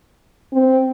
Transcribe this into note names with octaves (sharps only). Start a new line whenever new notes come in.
C4